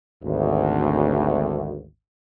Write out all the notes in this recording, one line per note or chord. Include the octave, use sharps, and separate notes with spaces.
G#1 D2